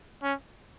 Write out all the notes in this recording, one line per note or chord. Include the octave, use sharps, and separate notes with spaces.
C#4